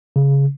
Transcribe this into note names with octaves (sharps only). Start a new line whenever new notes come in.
C#3